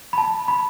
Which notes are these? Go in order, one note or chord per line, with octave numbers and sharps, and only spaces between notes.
B5
A5
B5